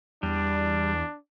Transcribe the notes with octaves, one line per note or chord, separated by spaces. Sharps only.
E2 G3 D4